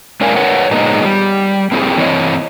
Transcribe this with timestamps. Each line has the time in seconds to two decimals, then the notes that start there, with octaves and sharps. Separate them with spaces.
0.21 G#3 C#4 A#4 D5 F5 G#5
0.36 A#4 B4 C#5 F#5
0.71 A#2 G#3 B3 D#4
1.04 G3
1.72 A#3 C4 E4 G4 G#4
1.97 E3 C4 E4 C#5 D#5